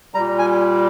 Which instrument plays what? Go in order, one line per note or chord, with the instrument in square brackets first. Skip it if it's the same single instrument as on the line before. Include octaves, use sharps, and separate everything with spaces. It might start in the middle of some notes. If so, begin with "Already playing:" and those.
[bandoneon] A#2 G3 A#5
G#5